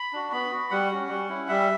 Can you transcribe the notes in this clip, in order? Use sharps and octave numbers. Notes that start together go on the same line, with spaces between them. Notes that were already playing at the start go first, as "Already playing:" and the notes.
Already playing: B5
D4 F#4
B3 B5
F#4
G3 F#5
C#4 F#4
G3
C#4 E4
G3 E5